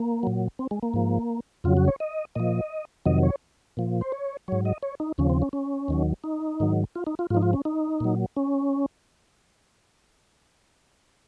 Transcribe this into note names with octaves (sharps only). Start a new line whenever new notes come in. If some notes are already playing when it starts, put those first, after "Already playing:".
Already playing: A#3
A#2 F#3
C4
G#3
A#3
G#2 F3
F2 C#3 F#3 F4
F#4
C#5
D#5
A#2 F3 D#5
F2 C3 D#3 F#3 D#5
C#5
A#2 F3
C5
C#5
G#2 F#3 C#5
D#5
C#5
D#4
D#2 C#3 F3 C#4
C4
C#4
C#4
D#2 D#3 F#3
D#4
G#2 D#3 F#3
F4
D#4
F4
G#2 F3 D#4 F4
F4
C#4
D#4
A#2 F#3
C#4